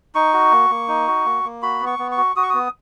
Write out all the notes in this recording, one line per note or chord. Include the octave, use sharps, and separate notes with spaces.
D#4 C#6
F#4
A#3
A#3
D#4
F#4
A#3
A#3
F#4 B5
B3
C#6
B3
C#6
F#4
F#4 D#6
C#6
B3 D#6